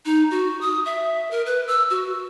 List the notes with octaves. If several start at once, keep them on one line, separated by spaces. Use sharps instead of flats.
D#4
F#4
D#6
E5
A#4
B4
E6
F#4